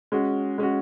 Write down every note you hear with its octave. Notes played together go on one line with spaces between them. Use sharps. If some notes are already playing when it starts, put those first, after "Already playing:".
G#3 C#4 F#4
G#3 C#4 F#4